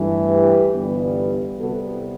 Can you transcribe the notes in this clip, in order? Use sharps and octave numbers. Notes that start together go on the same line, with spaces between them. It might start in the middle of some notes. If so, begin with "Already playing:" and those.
Already playing: G2 E3 A3
G4 B4
G1 G2 E3 G3 B3
C2 C3 G3 B3 F#4 A4